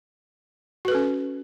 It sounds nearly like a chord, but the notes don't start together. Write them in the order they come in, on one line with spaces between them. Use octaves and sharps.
F#4 B4 A4 C#4